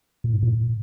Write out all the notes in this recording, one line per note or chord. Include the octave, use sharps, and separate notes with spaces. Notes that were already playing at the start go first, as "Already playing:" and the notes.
A#2
G#2
A#2